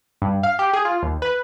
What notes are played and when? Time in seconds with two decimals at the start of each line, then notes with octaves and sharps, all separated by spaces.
0.22 G2
0.43 F5
0.59 G4
0.73 G#4
0.85 F4
1.03 D#2
1.22 B4